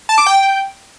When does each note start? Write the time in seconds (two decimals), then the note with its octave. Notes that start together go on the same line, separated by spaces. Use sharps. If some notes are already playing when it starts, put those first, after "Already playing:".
0.09 A5
0.18 D6
0.26 G5